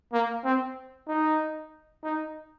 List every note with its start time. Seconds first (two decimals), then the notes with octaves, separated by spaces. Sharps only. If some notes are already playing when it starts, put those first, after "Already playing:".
0.13 A#3
0.44 C4
1.08 D#4
2.04 D#4